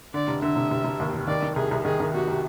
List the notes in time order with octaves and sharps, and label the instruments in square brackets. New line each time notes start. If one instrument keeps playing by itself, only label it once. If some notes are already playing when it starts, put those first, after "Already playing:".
[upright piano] D3 [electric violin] D5
[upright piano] F1
[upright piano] D3 [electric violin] E5
[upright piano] F1
F1
F1
D#2
F1
[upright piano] D#3 [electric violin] D5
[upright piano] D#3
[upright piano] C2 [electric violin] G#4
[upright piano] C2
[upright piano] D#3 [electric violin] G#4
[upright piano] D#3
[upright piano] C3 [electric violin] F#4
[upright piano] C3